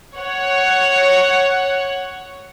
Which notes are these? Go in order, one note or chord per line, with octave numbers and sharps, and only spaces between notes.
C#5 F#5